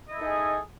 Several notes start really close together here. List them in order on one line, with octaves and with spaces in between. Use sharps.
D#5 E4 A4 D#4 G#4